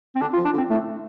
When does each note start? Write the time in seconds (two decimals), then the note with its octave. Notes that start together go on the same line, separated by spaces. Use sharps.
0.15 C4
0.21 D3 D4
0.33 F4
0.37 F3
0.45 D4
0.53 D3
0.58 C4
0.70 A2 A3